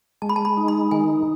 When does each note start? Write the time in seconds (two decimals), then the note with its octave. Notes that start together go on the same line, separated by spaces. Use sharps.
0.22 G#3 A5
0.29 B5
0.36 A5
0.45 B5
0.57 D#4
0.68 B5
0.91 D#3 G#5